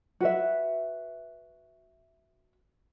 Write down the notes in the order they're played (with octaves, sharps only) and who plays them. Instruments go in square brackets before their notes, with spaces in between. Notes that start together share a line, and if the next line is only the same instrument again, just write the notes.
[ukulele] F#4 B4 E5